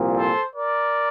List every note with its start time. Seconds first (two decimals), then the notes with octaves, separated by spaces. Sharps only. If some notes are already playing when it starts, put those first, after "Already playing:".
Already playing: C2 A#2 F3
0.16 A4 C5
0.54 A#4 D5